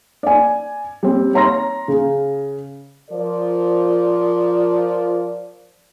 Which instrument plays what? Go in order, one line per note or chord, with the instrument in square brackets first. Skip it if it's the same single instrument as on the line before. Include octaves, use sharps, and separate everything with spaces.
[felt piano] D5 G#5
G3 C4
C#5 A#5 C6 A#6
C#3
[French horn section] F3 A#4 D5